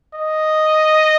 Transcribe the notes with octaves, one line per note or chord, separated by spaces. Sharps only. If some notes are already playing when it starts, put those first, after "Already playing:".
D#5